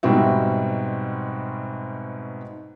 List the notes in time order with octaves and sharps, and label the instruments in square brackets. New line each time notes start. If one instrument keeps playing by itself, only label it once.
[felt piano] G#2 B2 G3 C4 F#4 E5